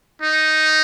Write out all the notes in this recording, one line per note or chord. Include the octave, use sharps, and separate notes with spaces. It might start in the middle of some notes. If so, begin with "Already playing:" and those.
D#4